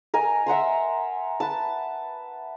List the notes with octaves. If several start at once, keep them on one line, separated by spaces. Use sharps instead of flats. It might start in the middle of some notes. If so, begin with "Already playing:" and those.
A#4 D#5 G#5
E5 F#5 A#5 C6
B4 A5